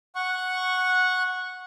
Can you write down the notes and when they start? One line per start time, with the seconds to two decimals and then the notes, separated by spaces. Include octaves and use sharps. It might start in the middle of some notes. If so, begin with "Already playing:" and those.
0.15 F#5 C#6